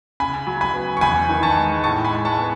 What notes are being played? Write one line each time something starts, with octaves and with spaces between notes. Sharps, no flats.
C#3 G#5 B5
F#3
G#5 B5
B3
C#6
E2 G#5 B5
D#3
A5 C#6
G#3
A2 A5 C#6
G#5 B5
G#3
A5 C#6
B3